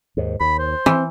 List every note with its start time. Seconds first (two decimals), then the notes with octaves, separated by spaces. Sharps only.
0.17 D#2 G#2
0.40 D#2 B5
0.59 C5
0.86 E3 C4